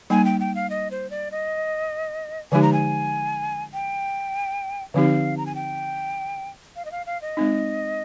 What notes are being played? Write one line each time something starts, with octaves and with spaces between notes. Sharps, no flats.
G3 A#3 D#4 G#5
G5
G5
F5
D#5
C5
D5
D#5
D3 F3 G#3 D#4 G4 G#5
A#5
G#5
G5
D3 F3 C4 D#4 G4 F5
A#5
G#5
G5
F5
D#5
F5
F5
D#5
G#3 C4 D#4